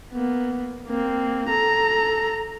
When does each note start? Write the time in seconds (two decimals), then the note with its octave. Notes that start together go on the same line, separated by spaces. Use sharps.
0.13 A#3 B3
0.88 A#3 C4
1.49 A4 A#5